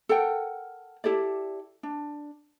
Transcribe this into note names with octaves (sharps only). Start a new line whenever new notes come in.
A4 A#4 F#5 G5
E4 G4 A4 D5
D4